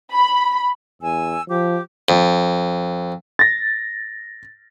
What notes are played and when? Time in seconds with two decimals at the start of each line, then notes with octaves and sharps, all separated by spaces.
0.13 B5
1.02 E2 G#5 E6
1.49 F3 G4 D6
2.09 F2
3.39 A6 A#6